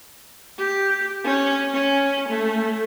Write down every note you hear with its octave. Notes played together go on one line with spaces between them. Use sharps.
G4
C#4
C#4
A3